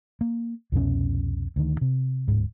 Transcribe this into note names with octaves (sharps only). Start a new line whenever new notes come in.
A#3
C2 F2 B2 C#4
D2 D#3
C3
D1 G#2